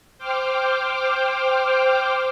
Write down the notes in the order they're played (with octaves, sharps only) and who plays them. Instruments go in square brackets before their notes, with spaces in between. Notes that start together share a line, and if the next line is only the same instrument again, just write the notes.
[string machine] C5 G5 D6 F6